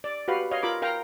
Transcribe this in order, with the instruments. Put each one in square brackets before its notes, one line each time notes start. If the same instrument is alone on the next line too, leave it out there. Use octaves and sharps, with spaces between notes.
[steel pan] D5
F#4 G4 B4 F5
C#5 D#5 F5
F4 A#4 B5 D6
A#4 F5 G5 A#5